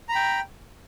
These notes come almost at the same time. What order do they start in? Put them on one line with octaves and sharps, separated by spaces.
A#5 B5 G5